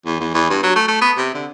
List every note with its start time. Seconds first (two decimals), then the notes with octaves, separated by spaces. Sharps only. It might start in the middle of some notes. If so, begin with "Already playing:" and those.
0.06 E2
0.20 E2
0.34 E2
0.50 G2
0.63 F#3
0.76 A3
0.88 A3
1.01 B3
1.17 C3
1.34 D3